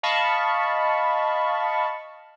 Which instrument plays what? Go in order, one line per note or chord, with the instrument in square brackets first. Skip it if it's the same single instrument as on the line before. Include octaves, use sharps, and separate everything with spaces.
[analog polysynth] D#5 F5 A5 B5 C#6